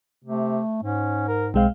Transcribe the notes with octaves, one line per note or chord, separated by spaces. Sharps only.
C3 A3
G#2 C#4
A#4
B1 G#3 C4 F5